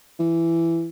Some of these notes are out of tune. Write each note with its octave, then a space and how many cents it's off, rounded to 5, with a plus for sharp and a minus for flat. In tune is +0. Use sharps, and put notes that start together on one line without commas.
E3 +15